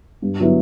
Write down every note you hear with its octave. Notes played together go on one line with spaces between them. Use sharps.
G2
D3 F#3 B3 E4